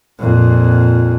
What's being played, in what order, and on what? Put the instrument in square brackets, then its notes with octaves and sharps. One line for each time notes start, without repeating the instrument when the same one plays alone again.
[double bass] F2 A#2